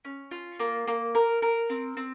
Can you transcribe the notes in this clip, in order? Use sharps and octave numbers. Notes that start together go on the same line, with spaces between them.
C#4
F4
A#3
A#3
A#4
A#4
C4
C4